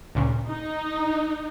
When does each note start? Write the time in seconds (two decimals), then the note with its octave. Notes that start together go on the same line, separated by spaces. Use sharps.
0.15 D2 A#2 C#3
0.48 D#4